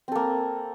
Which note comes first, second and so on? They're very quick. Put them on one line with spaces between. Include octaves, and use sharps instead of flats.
C4 A4 A#3